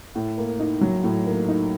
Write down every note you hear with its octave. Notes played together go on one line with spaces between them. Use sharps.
A2
A#3
D#4
F#3
A2
A#3
D#4